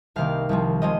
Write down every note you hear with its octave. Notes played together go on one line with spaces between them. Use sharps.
C2 C3 D#3 A#3 F5
C2 C3 F3
C3 F3 G#3 D#5